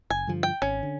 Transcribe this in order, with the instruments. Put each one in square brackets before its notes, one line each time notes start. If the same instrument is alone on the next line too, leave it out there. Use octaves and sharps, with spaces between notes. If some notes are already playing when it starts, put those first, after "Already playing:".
[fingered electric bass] F#1 [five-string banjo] G#5
[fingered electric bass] G2 D3 F3
[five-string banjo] G5
[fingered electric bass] G#1 [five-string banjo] C#4
[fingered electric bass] D3